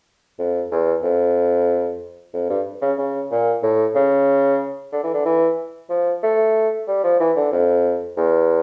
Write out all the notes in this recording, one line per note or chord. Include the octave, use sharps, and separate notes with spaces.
F2
E2
F2
F2
G2
C#3
C#3
A#2
A2
C#3
D3
E3
D3
E3
F3
A3
G3
F3
E3
D3
F2
E2